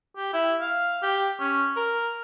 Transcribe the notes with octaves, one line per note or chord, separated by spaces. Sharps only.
G4
E4
F5
G4
C#4
A#4